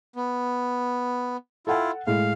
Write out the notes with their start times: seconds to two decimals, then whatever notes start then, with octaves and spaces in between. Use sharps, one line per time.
0.16 B3
1.67 E4 F4 A4 F#5 G5
2.07 A2 G#3 E4 F5